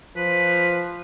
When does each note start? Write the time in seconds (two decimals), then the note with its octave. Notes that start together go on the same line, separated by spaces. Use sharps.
0.16 F3 B4